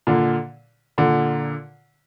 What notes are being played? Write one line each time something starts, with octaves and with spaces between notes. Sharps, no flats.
A#2 D3
A#2 D3